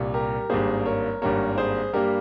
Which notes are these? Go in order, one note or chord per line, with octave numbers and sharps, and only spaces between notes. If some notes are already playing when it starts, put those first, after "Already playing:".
Already playing: C2 A#2 G3
G4 A#4
G#1 G2 G3 A#3 G#4 C5
A#4 C#5
G#1 G2 G3 A#3 A#4 C#5
G#4 C5
G2 G3 A#3 G4 A#4